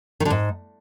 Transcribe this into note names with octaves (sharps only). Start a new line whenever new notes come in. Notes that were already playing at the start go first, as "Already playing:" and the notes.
D#3
D3
G#2